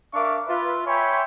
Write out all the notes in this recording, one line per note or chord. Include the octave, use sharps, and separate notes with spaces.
D4 A#4 E5 F5 C#6 D6
F4 B4 E5
C#5 E5 G5 G#5 B5 C6